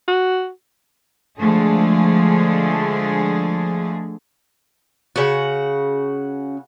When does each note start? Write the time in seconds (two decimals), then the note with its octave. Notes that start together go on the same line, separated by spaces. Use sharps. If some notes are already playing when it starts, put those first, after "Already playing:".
0.08 F#4
1.39 D3 F3 G#3 A3 G#4
5.16 C#3 F#4